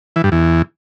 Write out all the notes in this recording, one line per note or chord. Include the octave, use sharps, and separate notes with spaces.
E3
G2
E2